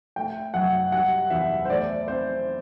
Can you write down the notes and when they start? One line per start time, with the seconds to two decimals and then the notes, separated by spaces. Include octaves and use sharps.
0.16 A3 G5
0.54 F#2 F#5
0.92 G3 F#5
1.30 E2 E5
1.65 C5
1.69 A3 D5
2.08 C4 C5